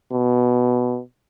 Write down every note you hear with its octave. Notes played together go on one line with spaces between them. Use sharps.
B2